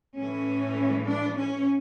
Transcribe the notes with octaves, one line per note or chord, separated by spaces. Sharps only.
A2 E3 A3 C#4
D4
C#4